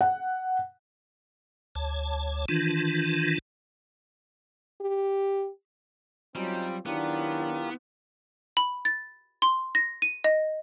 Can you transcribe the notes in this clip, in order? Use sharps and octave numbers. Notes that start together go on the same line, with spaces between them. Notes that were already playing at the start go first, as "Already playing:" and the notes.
F#5
D2 C#5 A5
D#3 E3 D4 F4
G4
F#3 G3 C4 C#4 D#4 F4 G#5
D#3 F#3 B3 D4 E4 F4 G4 A#4
B5
A6
C6
A#6
D#7
D#5